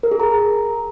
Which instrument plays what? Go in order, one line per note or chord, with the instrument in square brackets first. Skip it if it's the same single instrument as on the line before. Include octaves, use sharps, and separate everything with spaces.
[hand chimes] A#4
G#4
A#5